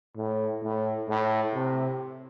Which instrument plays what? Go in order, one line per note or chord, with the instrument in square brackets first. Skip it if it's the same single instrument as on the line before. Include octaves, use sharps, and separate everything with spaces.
[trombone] A2
A2
A2
C3